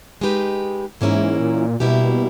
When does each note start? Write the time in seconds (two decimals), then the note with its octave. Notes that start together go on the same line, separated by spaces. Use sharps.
0.21 G#3 D#4 G4 B4
1.01 G#2 E3 A#3 C#4 E4 A#4
1.40 A#2
1.80 B2 G3 A#3 E4 G4